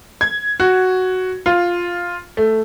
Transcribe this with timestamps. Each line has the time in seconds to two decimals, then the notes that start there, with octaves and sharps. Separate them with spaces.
0.21 G#6
0.60 F#4
1.46 F4
2.37 A3